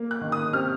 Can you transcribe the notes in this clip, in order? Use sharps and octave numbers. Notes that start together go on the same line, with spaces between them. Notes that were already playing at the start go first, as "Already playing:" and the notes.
Already playing: A#3
F#6
D#3
D#6
C3 F6